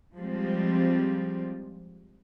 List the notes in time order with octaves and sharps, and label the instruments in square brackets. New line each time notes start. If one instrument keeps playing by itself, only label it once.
[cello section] F3 G3 G#3 C4